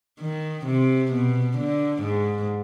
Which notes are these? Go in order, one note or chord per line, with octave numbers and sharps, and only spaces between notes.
D#3
C3
B2
D3
G#2